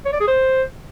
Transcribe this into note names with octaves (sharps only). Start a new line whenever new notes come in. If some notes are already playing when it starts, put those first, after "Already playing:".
C#5
D5
G#4
C5